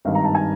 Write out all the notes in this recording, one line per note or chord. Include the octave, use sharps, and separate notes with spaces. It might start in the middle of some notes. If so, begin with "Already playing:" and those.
G#1 G2 D#3 F5
A#5
A5
G#5